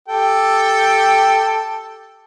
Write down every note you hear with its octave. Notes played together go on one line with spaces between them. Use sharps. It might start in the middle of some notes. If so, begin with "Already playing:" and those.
G4 A4 G5